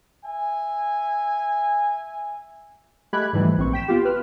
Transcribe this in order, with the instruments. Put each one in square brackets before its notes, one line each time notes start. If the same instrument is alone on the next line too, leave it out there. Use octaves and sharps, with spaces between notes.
[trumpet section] E5 G#5
[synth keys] G#3 A3 G4 B5 F#6 G#6
G#2 D3 E3 F3 G3 A3
A#1 C4 C#6
G5 B6 E7
B3 F4 G4
B4 F6